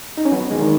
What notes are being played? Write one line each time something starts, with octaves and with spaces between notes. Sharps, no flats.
D#4
C#4
F#3 B3
D#3 G#3
D#3